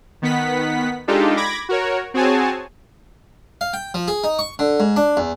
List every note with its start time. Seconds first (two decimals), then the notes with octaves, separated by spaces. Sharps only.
0.22 D#3 B3 F#5 B6
1.08 G#3 D4 D#4 F4 G4 A4
1.37 B5 D6 G#6 A#6
1.69 F#4 A#4 C#5
2.14 C4 F#4 G#4 C#5 G#5 A5
3.61 F5
3.73 G5
3.94 F3
4.08 G#4
4.24 D#4
4.39 C#6
4.59 D3
4.80 G#2
4.96 D4
5.17 E2